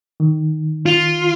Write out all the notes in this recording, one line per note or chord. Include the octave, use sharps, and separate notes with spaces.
D#3
F4